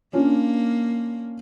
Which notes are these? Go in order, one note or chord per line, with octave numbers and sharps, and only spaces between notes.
A#3 C#4 D4 F4